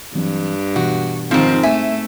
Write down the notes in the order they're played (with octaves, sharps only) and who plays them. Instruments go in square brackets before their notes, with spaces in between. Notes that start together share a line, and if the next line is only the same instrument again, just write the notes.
[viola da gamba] G2 [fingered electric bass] E3 F#3 C4
[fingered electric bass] B2 E3 B3 [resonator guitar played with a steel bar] F#4
[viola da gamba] G#2 C4 [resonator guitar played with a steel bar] D#3 F3
[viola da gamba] A3 [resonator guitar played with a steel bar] E5 G#5